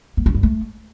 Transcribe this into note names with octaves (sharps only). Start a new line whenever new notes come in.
A#3
C#4
G2
A3